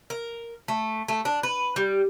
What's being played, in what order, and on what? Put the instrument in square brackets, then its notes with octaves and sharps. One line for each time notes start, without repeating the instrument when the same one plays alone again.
[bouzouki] A#4
A3
A3
D4
B4
G3